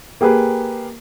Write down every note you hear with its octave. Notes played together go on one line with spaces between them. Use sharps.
A#3 G4 G#4 B4